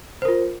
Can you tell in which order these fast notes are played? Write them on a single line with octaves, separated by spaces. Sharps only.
C5 A#4 F4